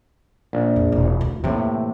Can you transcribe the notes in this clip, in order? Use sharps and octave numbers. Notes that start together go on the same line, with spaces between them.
A#1
F2
E1
D2
A2 C3 E3 A#3